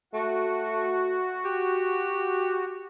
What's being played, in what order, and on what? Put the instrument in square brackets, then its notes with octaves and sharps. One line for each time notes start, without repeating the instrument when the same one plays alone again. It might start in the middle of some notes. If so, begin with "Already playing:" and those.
[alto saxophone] A3 [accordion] F#4
[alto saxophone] G4